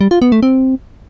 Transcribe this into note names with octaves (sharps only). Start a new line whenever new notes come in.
G3
F4
B3
A3
C4